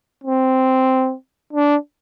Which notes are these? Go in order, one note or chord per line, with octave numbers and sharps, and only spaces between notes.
C4
D4